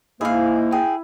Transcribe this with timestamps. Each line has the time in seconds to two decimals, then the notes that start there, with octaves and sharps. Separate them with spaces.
0.21 G#2 A#3 E4 G#4 F5
0.72 G#4 G5